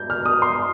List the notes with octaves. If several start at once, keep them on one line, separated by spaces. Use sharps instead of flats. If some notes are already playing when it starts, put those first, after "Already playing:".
Already playing: G6
F6
D#6
C6